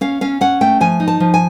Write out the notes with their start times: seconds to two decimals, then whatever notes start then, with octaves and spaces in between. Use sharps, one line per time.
0.01 C#4 F5
0.21 C#4 F5
0.41 C#4 F#5
0.61 A3 G5
0.81 F3 G#5
1.00 D#4
1.08 A5
1.20 F3
1.34 G#5